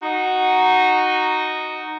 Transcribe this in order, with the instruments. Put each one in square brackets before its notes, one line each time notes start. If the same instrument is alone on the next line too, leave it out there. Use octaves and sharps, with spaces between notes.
[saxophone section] D#4 F#4